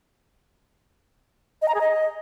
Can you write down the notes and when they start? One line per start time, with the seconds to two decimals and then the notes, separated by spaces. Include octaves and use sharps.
1.62 D#5
1.68 A#5
1.74 G#4
1.81 D#5